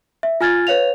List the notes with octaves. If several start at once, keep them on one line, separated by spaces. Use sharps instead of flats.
E5
F4 G#5 F6 G#6 A6
B4 C#5 F5 F7